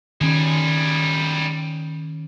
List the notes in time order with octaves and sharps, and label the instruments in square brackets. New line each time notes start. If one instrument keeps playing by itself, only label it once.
[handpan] D#3 C#4 [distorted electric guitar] G3 G#4